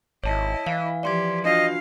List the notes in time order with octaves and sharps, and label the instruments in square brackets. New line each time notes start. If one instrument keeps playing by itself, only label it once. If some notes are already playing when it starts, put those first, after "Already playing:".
[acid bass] G#1 [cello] E4 D#5 [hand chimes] C#5 A5
[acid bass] E3 [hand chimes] F5
[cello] F3 G4 [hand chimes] D5 C6 G#6
[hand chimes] D4 F4 F#4 [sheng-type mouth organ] D#5 [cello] F5